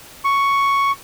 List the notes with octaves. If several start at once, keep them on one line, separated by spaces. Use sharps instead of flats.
C#6